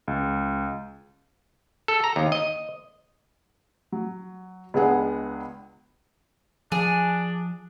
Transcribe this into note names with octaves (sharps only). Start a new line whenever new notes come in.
C#2
A4
A#5
D#2
D#5
F#3
C#2 G#3 B3 D4 G#4 F#5
F3 D4 G#4